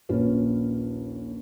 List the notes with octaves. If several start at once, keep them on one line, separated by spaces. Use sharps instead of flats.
A#1 D#2 C#4 F4 B4